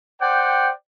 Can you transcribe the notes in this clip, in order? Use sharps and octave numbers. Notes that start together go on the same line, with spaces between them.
C5 D5 F#5 G5